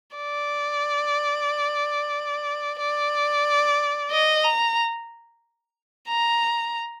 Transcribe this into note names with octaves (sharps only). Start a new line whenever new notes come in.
D5
D5
D#5
A#5
A#5